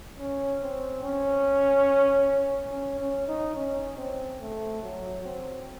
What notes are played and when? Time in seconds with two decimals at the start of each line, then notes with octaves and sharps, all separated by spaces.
0.19 C#4
0.62 C4
1.03 C#4
2.72 C#4
3.01 C#4
3.28 D#4
3.56 C#4
3.98 C4
4.41 A3
4.83 F#3
5.25 C4